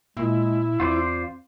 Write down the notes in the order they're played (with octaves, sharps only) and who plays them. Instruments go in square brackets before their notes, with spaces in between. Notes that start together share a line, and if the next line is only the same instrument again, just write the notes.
[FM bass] A#2 [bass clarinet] G#3 [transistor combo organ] E4
[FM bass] E2 [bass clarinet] C4 [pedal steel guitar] F4 C5 D5